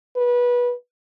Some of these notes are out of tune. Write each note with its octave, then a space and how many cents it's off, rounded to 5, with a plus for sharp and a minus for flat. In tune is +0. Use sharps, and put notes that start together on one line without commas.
B4 -20